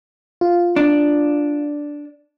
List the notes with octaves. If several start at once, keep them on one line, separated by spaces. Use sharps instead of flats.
F4
D4